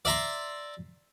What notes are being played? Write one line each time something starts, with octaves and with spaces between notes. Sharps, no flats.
D5 E5 A#5 C6